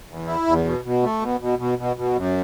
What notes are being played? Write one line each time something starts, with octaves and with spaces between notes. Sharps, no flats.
E2
E4
E2
B2
B2
A3
B2
B2
B2
B2
B2
F#2